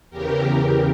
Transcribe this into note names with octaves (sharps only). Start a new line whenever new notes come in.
E2 C#3 E3 G4 A#4